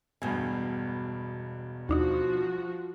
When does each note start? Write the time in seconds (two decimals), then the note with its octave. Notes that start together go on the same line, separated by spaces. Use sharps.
0.22 E1 G2 B2 G#5
1.89 D#2 F3 D4 D#4 F#4